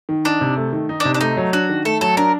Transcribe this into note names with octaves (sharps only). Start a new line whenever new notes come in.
D#3
D4 D#4
C3
A3
D#3
D#4
D4
C3
D4
A3 D#4
F#3
D4 F#4
D#3
A3 A4
F#3 A4
D4 A#4